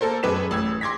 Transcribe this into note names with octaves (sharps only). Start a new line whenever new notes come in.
A#3 A4 A#4 C5
F#2 G#4 B4 D6 B6 E7
A1 E6 G#6
C6 D6 G#6 A#6 B6